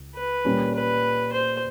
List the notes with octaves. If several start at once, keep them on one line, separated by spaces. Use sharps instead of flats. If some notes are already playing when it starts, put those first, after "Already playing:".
Already playing: C#2
B4
A#2 G3 A#3 C#4
B4
C5